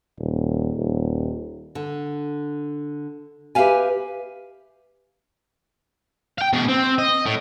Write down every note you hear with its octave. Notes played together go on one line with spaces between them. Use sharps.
D#1
D#1
D3
G4 B4 C5 E5 F5 G#5
F5 G5
B2 G#4
C4
D#5
A2